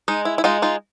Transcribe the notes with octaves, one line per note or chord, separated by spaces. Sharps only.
G#3 D#4
E4
E4
G#3 D#4 F4
D#4 F4